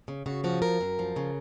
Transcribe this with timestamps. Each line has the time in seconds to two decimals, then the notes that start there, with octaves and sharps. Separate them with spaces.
0.08 C#3
0.26 C#3 F#4
0.44 F3 F#4
0.62 F#2 A#4
0.81 F#2
0.99 F3
1.16 C#3